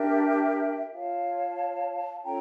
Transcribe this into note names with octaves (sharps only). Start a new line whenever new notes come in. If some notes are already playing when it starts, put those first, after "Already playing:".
Already playing: D4 G4 A#4 E5 G5
F4 C#5 F5 A5
C#4 F4 A4 C#5 G5 A#5